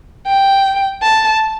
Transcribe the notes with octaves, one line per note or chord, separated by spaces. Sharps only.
G5
A5